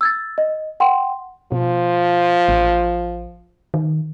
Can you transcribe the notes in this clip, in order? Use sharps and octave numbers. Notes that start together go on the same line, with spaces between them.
E6 G#6 A6
D#5
F#5 G5 C6
B2 F3
A1
D#3